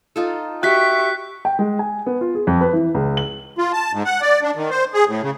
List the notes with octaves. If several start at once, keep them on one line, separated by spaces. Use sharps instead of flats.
D#4 F4 A4
F#4 G4 E5 C#6 F#6 B6
G5
G#3
G#5
B3
F4
G#4
F2
B4
E3
C#2
F#7
F4
A5
G#2
F#5
D5
D4
D#3
C5
G#4
A2
C#3